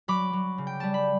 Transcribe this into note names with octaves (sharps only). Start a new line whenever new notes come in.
F#3 B5 D6
F#3
C#3
G5
G3 A5
B5